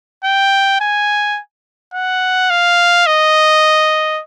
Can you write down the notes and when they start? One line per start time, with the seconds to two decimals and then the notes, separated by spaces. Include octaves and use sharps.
0.24 G5
0.81 G#5
1.94 F#5
2.50 F5
3.06 D#5